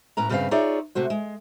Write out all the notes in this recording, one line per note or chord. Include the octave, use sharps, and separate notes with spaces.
A2 C#4 B4 A#5
G2 C#3 C4 F#4 B4 F5
D#4 F4 G#4 C#5 D5 E5
C3 A3 F#4 C5
G#3